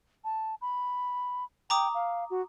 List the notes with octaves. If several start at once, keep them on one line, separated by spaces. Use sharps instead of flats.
A5
B5
G5 A#5 D6 D#6
F5
F#4